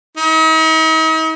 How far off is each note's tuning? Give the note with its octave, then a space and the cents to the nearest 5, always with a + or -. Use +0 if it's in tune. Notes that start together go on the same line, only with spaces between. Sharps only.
D#4 +45